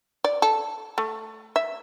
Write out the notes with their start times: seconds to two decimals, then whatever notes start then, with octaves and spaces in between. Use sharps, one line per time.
0.24 D5
0.42 A4
0.98 A3
1.56 E5